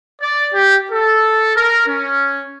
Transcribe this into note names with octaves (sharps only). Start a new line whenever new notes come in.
D5
G4
A4
A#4
C#4